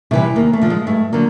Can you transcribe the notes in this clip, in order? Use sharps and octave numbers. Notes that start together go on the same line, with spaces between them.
C3 E3 G3 A3
D#2 A#3
A3
D3 F3
G#3
G2 A3
D3 F#3 A#3